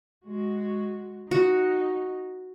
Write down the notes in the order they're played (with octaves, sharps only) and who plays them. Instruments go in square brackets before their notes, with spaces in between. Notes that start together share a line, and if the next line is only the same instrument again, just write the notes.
[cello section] G#3 F#4
[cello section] D#4 [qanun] F#4